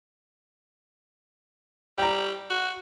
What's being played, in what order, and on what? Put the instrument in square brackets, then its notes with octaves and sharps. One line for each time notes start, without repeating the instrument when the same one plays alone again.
[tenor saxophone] G3 [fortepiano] G5 A#5
[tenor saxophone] F#4